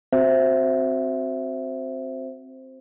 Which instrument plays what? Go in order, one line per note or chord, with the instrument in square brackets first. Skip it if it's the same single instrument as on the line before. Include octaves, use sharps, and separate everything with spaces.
[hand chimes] C4 F#4 C5 E5